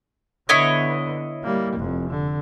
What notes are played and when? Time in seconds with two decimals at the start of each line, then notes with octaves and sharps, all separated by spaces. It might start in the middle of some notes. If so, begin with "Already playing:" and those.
0.49 D3 B3 E4 C#5 D#5
1.44 G3 A#3
1.77 F1 F2
2.10 D3